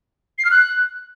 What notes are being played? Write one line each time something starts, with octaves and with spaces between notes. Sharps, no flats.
C7
F6
F#6